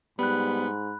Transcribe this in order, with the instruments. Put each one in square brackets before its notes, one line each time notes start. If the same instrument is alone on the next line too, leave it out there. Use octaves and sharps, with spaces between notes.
[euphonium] G#2 [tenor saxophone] G3 [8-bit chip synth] B3 [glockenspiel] B5 F#6